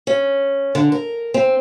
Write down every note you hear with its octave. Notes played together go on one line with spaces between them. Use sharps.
C#4
D3
A#4
C4